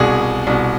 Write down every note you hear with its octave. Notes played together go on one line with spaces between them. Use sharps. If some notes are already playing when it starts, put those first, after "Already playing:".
Already playing: C2 B2 G#4
C2 B2